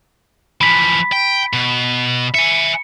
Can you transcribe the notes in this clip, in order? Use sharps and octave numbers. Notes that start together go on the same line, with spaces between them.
E3 F3 B5 B6
G5
B2
E5 G#5 C#7